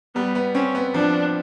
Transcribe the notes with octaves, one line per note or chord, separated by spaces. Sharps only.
G3 B3
B3
C4 C#4
B3
F3 D4